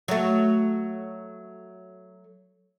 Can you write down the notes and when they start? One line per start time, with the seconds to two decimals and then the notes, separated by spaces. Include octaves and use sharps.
0.08 F#3 A3